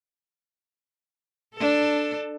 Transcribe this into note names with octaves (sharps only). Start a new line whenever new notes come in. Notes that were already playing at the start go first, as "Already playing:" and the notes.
D4 A4